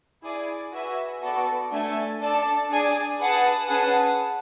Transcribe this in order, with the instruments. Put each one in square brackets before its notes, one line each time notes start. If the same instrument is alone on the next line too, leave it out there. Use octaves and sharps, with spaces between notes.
[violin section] E4 G#4 D5 G#5
F#4 B4 E5 G#5
B3 F#4 A4 D5
A3 D4 A4 E5 G#5
D4 A4 D5 A5
D4 G#4 D5 G#5
G#4 B4 F#5 A5
C#4 G#4 B4 F#5 A5